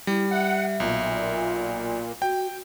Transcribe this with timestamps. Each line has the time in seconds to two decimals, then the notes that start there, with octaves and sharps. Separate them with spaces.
0.07 G3 E4
0.31 E5 F#5
0.80 B1 A#2
2.22 F#4 G5